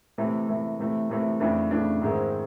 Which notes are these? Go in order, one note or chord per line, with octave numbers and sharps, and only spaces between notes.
C3 E3 A3
C3 E3 A3
C3 E3 A3
C3 E3 A3
F2 C#3 E3 A3 D4
F2 C#3 E3 A3 D4
G#2 D#3 G#3 C4 E4